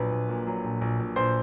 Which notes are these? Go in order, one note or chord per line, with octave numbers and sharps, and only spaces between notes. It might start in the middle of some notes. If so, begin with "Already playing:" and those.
Already playing: A#1 F#3 B4
A#1
A#2
F#3
A#1
A#1
A#1
A#1 C5 C6